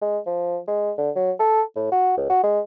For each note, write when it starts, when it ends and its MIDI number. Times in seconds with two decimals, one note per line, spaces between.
0.02 0.18 56
0.26 0.58 53
0.67 0.91 56
0.98 1.11 50
1.16 1.31 54
1.40 1.62 69
1.76 1.88 45
1.92 2.16 66
2.17 2.29 37
2.30 2.43 66
2.43 2.60 56